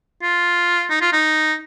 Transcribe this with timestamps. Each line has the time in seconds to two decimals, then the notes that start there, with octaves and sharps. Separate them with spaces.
0.23 F4
0.90 D#4
1.01 F4
1.13 D#4